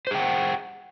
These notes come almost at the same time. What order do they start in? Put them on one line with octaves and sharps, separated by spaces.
C5 G#4 G5 F#5